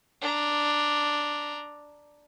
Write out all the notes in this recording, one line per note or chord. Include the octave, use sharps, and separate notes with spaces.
D4 A#5